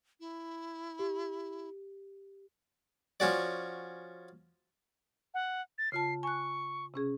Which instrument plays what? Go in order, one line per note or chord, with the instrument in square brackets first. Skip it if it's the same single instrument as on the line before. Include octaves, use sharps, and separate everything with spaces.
[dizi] E4
[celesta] G4
[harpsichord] F3 C#4 F#4 D5
[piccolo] F#5
A6
[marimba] C#3 F4 A5 [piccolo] C7
[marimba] G#5 F#6 [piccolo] C#6
[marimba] C3 C#4 G#4